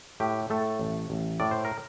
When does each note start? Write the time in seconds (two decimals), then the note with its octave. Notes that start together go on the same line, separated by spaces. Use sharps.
0.20 A2 G4
0.50 A2 A3 A4
0.79 A1
1.10 A1
1.40 A2 D5
1.51 C5
1.65 A#4